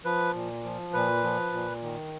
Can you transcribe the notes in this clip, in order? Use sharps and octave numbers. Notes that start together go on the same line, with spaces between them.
F3 B4
A#2
F3
A#2 B4
F3
A#2
D#3